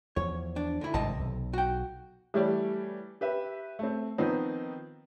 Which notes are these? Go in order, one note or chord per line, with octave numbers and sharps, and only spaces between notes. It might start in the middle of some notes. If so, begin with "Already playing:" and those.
E2 F3 C#5
D4
D3 E4
G#1 G2 C3 D#5 A5
B1
F#4 G5
E3 G3 A3 G4 C#5 D5
G4 B4 E5
A3 C4
D#3 F3 B3 C4 D#4